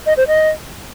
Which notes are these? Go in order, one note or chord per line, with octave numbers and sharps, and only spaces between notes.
D#5
C5
D#5